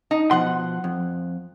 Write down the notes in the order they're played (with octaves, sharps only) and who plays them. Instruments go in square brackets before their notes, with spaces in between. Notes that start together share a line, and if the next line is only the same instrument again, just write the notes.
[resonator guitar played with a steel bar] D#4
[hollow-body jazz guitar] B2 F3 C6 [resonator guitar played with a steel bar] F#5
[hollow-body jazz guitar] F2